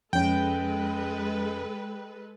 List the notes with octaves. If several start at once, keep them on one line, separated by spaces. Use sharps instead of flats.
F2 G#3 C#4 A4 B4 G5